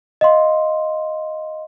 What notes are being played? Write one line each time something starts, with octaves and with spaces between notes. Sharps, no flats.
D#5 F5 C6